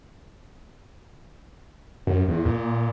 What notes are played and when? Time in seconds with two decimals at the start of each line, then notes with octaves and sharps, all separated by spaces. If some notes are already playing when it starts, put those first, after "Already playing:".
2.07 F#2
2.28 E2
2.45 A#2